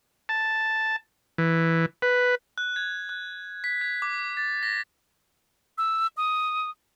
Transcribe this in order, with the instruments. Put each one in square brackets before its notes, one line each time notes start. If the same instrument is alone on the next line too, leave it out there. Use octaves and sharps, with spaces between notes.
[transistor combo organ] A5
E3
B4
[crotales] F#6
G#6
F#6
B6
G#6
D6
A6
A#6
[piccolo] E6
D#6